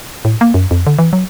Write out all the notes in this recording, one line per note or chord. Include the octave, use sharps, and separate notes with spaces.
A2
A#3
F#2
F2
D3
E3
F#3